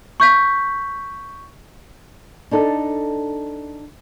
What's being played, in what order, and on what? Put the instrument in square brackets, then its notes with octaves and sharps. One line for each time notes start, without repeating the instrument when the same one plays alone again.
[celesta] C#6 G6 B6
[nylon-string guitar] D4 D#4 A4